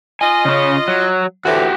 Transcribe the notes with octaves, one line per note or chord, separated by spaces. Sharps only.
F4 D#5 G#5
C#3 C#4
F#3
D2 A2 E3 F#4 G4